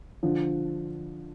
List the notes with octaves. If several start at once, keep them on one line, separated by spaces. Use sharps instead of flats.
D3 F3